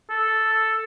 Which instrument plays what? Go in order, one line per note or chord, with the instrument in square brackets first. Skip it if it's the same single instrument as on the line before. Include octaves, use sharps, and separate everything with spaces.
[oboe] A4